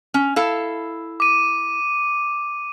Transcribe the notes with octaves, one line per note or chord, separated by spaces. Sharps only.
C#4
E4 A4 F5
D6 D#7